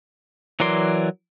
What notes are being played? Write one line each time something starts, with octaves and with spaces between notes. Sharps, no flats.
E3 F#3 A#4 D5 C6